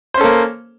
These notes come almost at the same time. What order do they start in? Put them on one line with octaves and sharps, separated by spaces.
C5 C#4 A4 A#3